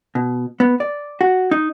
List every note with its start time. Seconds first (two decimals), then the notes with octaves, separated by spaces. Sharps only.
0.15 B2
0.60 B3
0.80 D5
1.21 F#4
1.51 D#4